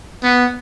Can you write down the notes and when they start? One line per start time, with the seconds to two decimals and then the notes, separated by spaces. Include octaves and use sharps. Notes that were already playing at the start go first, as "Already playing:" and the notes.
0.23 B3